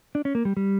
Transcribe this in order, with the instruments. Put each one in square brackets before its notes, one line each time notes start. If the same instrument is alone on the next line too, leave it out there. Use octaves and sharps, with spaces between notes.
[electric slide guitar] D4
C#4
A#3
G3
G3